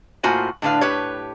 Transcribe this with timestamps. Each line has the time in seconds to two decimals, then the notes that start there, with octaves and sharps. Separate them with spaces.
0.23 A2 A#3 F4 F#4 C5 G#5
0.62 A2 D3 D4 B4 F5
0.81 A2 G4 B4 C#5